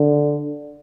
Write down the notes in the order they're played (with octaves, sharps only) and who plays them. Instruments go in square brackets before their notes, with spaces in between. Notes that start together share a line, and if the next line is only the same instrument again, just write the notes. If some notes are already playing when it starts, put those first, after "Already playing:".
Already playing: [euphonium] D3